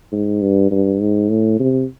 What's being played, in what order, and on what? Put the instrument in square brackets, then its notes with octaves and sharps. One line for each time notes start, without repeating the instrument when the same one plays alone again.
[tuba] G#2
G2
G2
G#2
A2
C3